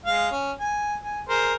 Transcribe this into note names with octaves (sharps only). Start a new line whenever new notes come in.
G#3 F5
C#4
G#5
G#5
G#4 A#4 C5